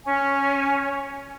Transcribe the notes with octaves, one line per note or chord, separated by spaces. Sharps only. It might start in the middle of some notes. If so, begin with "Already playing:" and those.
C#4 G#5